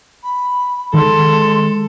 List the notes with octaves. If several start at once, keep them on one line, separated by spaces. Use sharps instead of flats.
B5
D#3 G#3 A4 C6